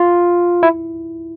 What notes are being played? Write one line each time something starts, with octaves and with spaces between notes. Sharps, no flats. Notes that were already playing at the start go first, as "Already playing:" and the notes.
Already playing: F4
E4